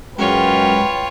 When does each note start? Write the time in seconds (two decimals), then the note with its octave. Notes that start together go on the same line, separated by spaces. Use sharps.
0.18 F#2 G#3 F4 B4 C#5 G5